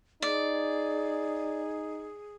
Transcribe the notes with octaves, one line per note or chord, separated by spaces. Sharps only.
D#4 G#4 D5